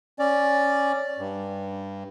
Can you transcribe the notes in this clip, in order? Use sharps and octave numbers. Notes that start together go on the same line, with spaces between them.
C#4 D5
G2